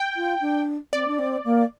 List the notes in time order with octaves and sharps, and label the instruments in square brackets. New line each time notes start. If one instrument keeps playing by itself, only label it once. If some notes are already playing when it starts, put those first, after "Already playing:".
Already playing: [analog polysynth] G5
[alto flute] F4
D4
[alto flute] C4 [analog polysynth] D5
[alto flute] D4
C4
A#3